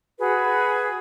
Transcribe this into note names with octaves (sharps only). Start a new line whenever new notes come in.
F#4 G#4 B4